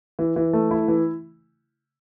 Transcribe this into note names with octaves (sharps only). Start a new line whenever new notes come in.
E3
E3
A3
E4
E3